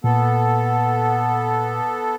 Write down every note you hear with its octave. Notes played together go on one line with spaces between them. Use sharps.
A#2 B3 A4 F#5